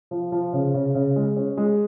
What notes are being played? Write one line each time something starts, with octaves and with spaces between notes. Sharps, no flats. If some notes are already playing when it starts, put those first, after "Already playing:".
F3
F3
C#3
C#3
C#3
G#3
C#4
G#3